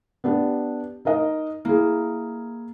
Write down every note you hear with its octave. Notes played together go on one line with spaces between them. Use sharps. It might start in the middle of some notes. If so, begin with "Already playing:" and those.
B3 D4 G4
D#4 A#4 D#5
A#3 E4 G#4